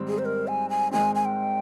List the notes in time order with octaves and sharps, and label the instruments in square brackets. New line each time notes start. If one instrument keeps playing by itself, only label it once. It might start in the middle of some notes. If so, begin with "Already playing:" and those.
Already playing: [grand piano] G#1 G#2 G3 C4
[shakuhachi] G#4
C5
A#4
G#5
G#5
[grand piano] G#1 G#2 D#3 G#3 C4 [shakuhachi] G#5
[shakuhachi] G#5
G5